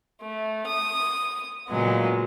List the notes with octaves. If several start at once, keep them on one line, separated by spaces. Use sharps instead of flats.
A3
D#6
A#2 C#3 F#3 G#3 B3